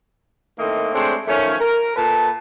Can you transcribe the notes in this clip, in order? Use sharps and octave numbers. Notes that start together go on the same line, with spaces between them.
A2 D#3 A3 A#3 C4 D#5
G#3 A3 C4 D4 C5 C#5
D#3 F3 A3 C#4
A#4
A#2 A4 B4 A5